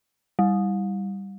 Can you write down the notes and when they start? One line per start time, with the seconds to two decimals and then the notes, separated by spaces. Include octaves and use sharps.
0.39 G3